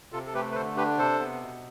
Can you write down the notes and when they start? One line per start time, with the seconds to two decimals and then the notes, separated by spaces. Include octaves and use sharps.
0.12 C3 F4 A4
0.26 A4
0.34 A3 G4 B4
0.51 B4
0.55 D3 A4 C5
0.76 D4 G4 B4
0.98 C3 A4 C5
1.19 B3
1.41 B2